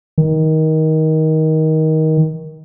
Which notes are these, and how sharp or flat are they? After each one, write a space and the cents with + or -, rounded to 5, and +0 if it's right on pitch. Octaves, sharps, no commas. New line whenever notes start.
D#3 +20